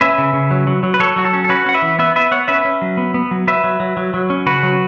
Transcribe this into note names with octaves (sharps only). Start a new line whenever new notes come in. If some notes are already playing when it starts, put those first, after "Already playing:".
C#4 B4 E5
C#3
C#3
F#3
F#3
F#3
B4
F#3 A4 C#5
F#3 F#4
A4
C#4
A4
C#4 F#4 B4
C#4 F#5
B4 E5
E3
B3 B4 E5
B3 B4 E5
B3 C#5 F#5
C#4 B4 E5
C#4
F#3
B3
B3
F#3
F#3 B4 E5
F#3
F#3
F#3
F#3
C#4
C#3 F#4 B4
F#3